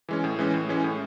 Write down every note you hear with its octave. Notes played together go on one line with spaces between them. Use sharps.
E3 G#3 C#4
A2
E3 G#3 C#4
A2
E3 G#3 C#4
A2